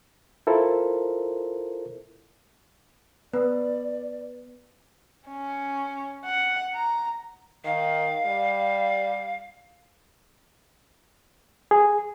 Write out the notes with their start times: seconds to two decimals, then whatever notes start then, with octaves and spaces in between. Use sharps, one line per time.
0.47 E4 F4 A4 A#4 C5
3.33 B3 B4 D5
5.28 C#4
6.25 F#5
6.74 A#5
7.65 D#3 F5
8.25 G3
11.71 G#4